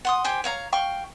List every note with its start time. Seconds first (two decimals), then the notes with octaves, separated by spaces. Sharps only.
0.05 F#5 C6 D#6
0.24 G4 C5 G#5
0.44 C#5 F5 A#5
0.72 F5 G5 C#6